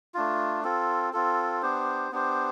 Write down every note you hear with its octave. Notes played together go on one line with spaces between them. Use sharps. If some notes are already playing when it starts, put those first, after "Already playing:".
A3 D4 F4
C4 F4 A4
C4 F4 A4
B3 D4 G4 C5
B3 D4 G4 C5